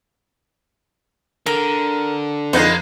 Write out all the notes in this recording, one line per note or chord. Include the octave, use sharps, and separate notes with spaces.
D3 A#4
F2 G#3 A#3 B3 D#4 F#6 C7